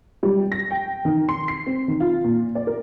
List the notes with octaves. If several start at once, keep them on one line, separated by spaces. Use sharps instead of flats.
G3
A#6
G5
D#3
C6
C7
C4
D#3
F4
A#2
D5
A#4